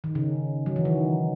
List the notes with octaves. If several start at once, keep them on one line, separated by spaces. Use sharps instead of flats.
D#3
C#3
F#3
E3
D#3